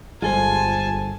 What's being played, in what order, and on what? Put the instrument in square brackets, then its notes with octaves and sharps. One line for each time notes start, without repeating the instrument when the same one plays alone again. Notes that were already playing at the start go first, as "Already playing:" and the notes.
[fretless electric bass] G1 G3 G#3 [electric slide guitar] F4 A4 C5 [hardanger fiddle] G#5 [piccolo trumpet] A5